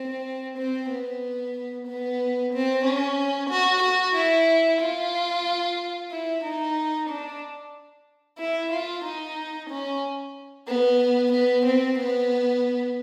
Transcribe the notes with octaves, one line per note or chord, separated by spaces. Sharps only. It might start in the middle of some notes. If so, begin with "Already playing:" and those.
Already playing: C4
C4
B3
B3
C4
C#4
F#4
F#4
E4
F4
E4
D#4
D4
E4
F4
D#4
C#4
B3
B3
C4
B3